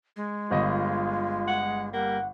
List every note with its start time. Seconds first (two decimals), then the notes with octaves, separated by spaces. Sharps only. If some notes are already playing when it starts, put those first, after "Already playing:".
0.16 G#3
0.51 G1 F4 D#5
1.47 F#5
1.93 G3 A#3 F#5